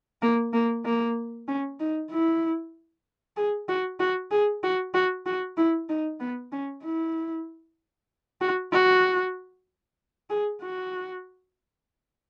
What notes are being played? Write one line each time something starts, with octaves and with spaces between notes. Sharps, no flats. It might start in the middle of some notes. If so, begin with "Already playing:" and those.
A#3
A#3
A#3
C#4
D#4
E4
G#4
F#4
F#4
G#4
F#4
F#4
F#4
E4
D#4
B3
C#4
E4
F#4
F#4
G#4
F#4